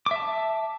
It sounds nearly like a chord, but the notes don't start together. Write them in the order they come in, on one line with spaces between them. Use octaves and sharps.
D6 E5 A5